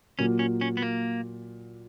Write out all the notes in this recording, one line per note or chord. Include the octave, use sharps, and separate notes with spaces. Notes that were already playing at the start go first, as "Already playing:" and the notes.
A#2 F#3 A#3 C#4
C#4
C#4
B3
A#3